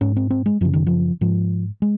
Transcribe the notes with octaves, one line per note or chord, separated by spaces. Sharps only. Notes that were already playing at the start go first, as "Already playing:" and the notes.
G#2 C#4
C4
C4
G#3
F#2 C#3 F3
D#3
F3
G#2 F3
G#3